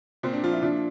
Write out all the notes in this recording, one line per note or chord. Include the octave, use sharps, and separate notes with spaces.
A#2 C4
D4
F3 F4
E4
A#2 D4